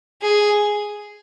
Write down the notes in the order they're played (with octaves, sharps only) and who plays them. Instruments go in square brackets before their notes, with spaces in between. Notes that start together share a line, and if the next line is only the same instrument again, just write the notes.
[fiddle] G#4